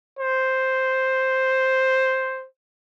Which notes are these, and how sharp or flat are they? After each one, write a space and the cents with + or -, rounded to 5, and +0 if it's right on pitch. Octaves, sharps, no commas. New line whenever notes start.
C5 +0